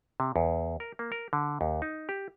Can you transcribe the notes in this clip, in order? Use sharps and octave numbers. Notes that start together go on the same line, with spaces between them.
C3
E2
A#4
A#3
A#4
D3
D#2
D#4
G4